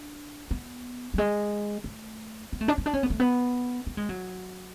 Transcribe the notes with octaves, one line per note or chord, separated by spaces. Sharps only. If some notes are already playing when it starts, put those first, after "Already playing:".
Already playing: D4
B3
F#3
G#3
A3
B3
A3
D4
C#4
D4
C#4
B3
A3
B3
B3
G#3
F#3